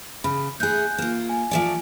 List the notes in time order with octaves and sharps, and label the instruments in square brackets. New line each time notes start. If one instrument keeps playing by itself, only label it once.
[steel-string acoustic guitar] C#3 [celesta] B5
[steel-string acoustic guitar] A3 G#4 [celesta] G#5 F#6 G6
[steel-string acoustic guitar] A#3 F4
[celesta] G#5
[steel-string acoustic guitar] F3 A3 D5 [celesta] G#5